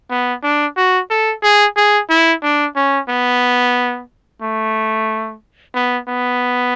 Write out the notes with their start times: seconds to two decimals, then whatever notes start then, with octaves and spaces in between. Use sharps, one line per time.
0.10 B3
0.43 D4
0.77 F#4
1.10 A4
1.43 G#4
1.77 G#4
2.09 E4
2.43 D4
2.76 C#4
3.09 B3
4.42 A3
5.75 B3
6.08 B3